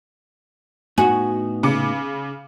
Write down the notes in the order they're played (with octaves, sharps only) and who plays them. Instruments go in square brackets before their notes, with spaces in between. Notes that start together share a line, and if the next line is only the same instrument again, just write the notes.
[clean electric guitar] A2 B3 D#4 [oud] F#4 [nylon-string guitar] G#5
[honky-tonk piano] C#3 D6 C#7